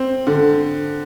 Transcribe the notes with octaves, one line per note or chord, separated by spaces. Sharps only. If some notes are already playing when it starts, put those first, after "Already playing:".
Already playing: C4
D3